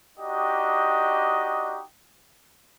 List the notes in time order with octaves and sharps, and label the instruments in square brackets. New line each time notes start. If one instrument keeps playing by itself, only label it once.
[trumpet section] D4 D#4 F#4 G4 D#5